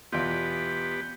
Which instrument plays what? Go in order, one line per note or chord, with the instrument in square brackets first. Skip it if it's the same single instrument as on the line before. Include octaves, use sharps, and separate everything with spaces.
[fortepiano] E2 B2 F4 [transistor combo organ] B3 G4